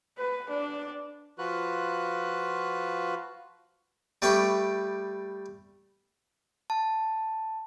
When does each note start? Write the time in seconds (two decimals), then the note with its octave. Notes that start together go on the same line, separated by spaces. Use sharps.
0.18 B4
0.49 D4
1.38 F3 F4 F#4 B4 F#6
4.22 G3 A3 B4 G5 C#6 D6
6.70 A5